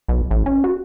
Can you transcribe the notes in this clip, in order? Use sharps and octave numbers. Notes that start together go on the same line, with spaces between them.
B1
A1
C#4
F#4